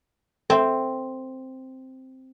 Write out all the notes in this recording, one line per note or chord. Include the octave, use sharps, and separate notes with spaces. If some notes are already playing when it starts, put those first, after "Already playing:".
C4 A4 E5